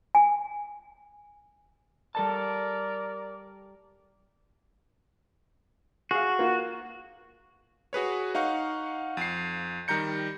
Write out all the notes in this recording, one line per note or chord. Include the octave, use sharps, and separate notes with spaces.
G#5
G3 A4 A#4 D5 A5
F#4 G#4 F5
A#3 F4
F#4 G#4 B4 C#5
D#4 F5 F#5 C#6
F2 C7
D#3 G3 A#5 G6 C#7